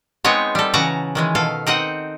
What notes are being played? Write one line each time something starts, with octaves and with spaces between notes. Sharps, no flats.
G#3 B3 C4 D#4 C#5
G3 A4
C#3 E3 F#4 A5 A#5
D#3 E3 G#3
B2 A4 F5
C4 D#4 D#5 F#5